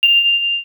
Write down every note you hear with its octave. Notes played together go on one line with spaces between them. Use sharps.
F7